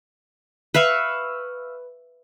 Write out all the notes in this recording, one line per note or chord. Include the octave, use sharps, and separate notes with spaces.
B4 E5 F5 C#6